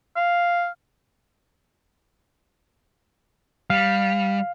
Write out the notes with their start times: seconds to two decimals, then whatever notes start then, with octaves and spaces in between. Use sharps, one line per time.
0.16 F5
3.70 G3 F5